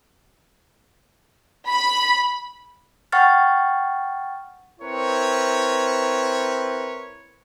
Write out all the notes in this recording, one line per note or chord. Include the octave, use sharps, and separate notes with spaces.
B5
F#5 G5 C#6 F6 A6
C4 E4 A#4 B4 C#5